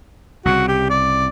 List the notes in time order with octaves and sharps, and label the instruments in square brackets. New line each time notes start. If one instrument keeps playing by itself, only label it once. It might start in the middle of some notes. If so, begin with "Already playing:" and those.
[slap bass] C2 C#3 [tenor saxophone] F#4
[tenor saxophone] G4
D5